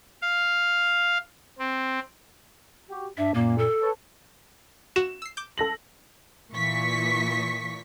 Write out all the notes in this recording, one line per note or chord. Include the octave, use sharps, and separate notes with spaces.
F5
C4
F#4 G4
G2 D4 E5
F#2 A#2 A#3
A4
B4 C#5 A5
F#4 E7
E6 C7
D6 G6
A4 A#6 F#7
A#2 E3 C#6 B6